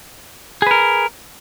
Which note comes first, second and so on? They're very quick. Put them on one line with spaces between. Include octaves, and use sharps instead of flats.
G#4 B4 A#4